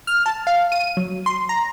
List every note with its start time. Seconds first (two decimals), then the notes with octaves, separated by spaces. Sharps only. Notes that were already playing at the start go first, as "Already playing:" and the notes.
0.07 F6
0.26 A5
0.47 F5
0.72 D#7
0.97 F#3
1.26 C6
1.49 A#5